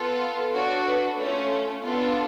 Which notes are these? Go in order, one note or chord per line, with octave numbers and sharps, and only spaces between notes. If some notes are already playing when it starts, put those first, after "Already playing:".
Already playing: B3 F4 A4
D4 F#4 A4 C#5
B4
A3 C#4 F4 C#5
B3 D4 F4 A4